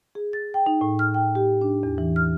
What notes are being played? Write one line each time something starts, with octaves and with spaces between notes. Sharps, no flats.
G#4
A6
G5
D#4
A2
F6
G5
G4
D4
E2
E3
F6